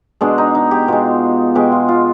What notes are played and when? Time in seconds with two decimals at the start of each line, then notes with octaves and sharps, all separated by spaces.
0.21 B2 G#3 D4
0.38 D#4
0.55 D#4
0.71 G4
0.88 B2 G#3 F4
1.55 B2 G#3 G4
1.72 F4
1.88 F4